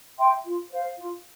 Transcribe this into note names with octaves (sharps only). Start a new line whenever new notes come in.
E5 G5 C6
F4
C5 F5
F4